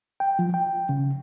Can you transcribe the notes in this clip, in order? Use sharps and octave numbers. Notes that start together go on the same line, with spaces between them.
G5
F3
G5
C#3